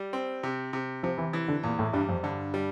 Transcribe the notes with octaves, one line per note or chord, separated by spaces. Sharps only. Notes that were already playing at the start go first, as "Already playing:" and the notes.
Already playing: G3
C4
C3
C3
C3 F3
E3
E3
D3
E2 A#2
A2
G2 G3
F2
G2 D3
G3